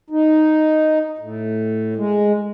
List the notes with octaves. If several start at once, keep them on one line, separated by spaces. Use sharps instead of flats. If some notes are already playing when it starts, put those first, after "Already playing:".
D#4
A2
G#3